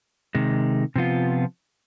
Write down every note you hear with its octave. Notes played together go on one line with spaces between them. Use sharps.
C3 D#3 G#3
C3 F3 B3 F4